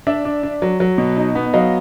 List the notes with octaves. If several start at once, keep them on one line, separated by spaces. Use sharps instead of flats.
D4 D5 E5
D4
D4
F#3
F#3
B2
D#4
B3
F#3 D#5 F5